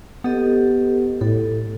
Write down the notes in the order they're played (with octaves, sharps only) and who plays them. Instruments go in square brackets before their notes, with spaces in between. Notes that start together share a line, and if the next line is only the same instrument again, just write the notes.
[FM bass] B3 [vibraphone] G4 A4 D#5
[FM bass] A2 [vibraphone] A4